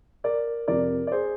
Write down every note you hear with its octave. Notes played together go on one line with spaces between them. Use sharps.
A#4 D5
F2 C3 F3 A#4 D5
D5
G#4 C5